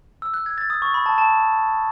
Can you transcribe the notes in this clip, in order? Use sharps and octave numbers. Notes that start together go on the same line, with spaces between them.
E6
F#6
G#6
A6
D#6
C#6
B5
A5
A5